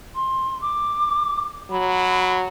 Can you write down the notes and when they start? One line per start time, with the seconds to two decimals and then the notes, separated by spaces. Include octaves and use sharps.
0.15 C6
0.61 D6
1.71 F#3 B5